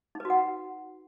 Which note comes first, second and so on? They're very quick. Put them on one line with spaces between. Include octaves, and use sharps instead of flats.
D#4 B4 F#4 F#5